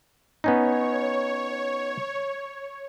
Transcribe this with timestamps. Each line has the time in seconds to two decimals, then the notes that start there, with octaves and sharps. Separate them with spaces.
0.44 B3 C#4 D#4 C#5